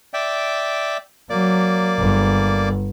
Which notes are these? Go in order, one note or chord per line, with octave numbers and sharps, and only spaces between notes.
D5 E5 G5
F#3 A#3 D5
G1